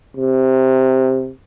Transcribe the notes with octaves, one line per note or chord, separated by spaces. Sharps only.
C3